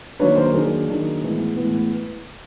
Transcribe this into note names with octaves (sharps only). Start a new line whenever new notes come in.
D#3 F#3 A#3 D4 B4 C#5
A#4 C5
D#3 F#3 A#3 D4 G#4 A#4
D#3 F#3 A#3 D4
A2 E3 G#3 B3
A2 E3 G#3 B3